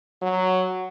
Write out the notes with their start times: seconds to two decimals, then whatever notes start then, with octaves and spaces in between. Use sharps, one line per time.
0.22 F#3